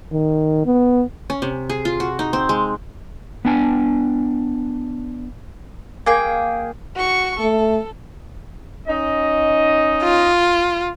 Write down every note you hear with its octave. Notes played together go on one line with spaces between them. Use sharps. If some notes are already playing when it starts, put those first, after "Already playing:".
D#3
B3
C#4
C3
G#4
F4
F#4
D#4
C4
G#3
B3 D4 G#5
A#3 G#4 G5
F#4 C#6
A3 A4
C#4 D#4 D#5
F4